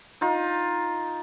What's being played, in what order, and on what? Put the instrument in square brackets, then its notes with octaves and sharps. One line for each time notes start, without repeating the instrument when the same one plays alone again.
[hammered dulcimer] D#4 F4